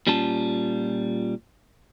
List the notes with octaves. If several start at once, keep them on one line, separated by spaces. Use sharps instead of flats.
A#2 G3 C#4 F4 A5